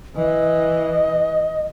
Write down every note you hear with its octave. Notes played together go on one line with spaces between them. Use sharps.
E3 D#5